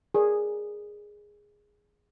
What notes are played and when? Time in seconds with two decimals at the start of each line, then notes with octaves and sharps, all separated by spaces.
0.14 G#4 A#4 D5